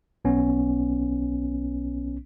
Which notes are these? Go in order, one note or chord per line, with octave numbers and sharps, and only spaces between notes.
B1 B3 C#4